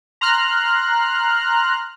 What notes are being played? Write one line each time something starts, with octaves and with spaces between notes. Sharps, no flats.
A#5 C6 F6 F#6